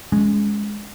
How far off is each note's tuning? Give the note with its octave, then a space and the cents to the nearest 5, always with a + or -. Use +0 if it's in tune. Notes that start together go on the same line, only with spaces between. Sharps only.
G#3 +0 C#4 +10